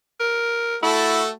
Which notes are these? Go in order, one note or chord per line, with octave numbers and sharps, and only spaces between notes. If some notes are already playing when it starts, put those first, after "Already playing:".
A#4
A3 E4 F#4 A4